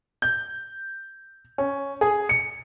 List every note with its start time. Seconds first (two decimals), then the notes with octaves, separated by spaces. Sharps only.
0.22 G6
1.58 C#4
2.01 G#4
2.29 C#7